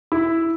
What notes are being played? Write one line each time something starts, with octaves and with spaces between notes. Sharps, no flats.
E4